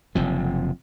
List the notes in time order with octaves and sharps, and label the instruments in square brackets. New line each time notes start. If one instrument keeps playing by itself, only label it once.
[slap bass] F#1 C3 F3